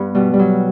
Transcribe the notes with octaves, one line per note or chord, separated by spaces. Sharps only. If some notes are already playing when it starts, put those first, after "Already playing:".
Already playing: G2 B3
B2 G3
G3
F#3